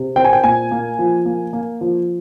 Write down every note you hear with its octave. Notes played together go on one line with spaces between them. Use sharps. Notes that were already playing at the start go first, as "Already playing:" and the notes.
Already playing: C3
C4 G5
G#5
G5
A#2 G#5
A#3
F3
A#3
A#3
F3